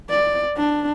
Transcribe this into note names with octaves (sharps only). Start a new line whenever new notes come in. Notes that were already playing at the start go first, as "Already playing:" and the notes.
D5
D4